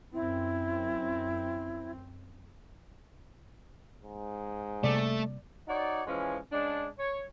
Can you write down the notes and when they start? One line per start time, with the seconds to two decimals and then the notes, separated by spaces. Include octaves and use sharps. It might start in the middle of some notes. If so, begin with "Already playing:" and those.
0.13 F#2 C4 E4
4.03 G#2
4.84 C3 G3 A3 A#3 D5
5.68 D#4 F#4 C#5 D5
6.07 E3 F3 G#3 C#4
6.52 C#3 G#3 D4
6.99 C#5